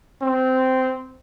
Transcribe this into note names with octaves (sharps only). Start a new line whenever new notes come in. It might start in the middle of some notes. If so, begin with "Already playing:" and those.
C4